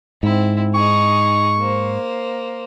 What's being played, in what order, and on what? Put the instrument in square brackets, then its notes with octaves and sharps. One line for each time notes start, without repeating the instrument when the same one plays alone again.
[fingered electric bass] G#2 [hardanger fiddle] C4 E4
[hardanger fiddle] D#4 G#4 [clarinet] C#6
[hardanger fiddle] A#3 C5